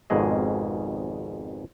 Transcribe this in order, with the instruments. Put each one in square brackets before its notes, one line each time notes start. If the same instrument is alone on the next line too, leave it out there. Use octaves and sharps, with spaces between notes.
[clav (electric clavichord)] G#1 F2 G#2 B2 G#4 D#5